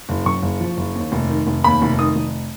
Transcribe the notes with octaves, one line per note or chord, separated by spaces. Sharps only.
F#1
F#2 C#6
F#1
F3
F#1
D#2
F1
D#3
F1
D#2 B5
F1
D#3 D#6
F1